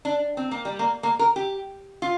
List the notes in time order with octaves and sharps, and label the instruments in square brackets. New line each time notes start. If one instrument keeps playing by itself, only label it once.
[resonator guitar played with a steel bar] D4
C4
A#3
G3
A#3
A#3
A#4
G4
F4